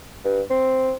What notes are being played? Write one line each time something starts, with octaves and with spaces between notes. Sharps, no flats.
G2
C4